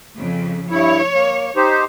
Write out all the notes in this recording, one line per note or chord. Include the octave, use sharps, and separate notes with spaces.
F2 C#3
G2 E4 C#5
A#3
D#4 G4 C5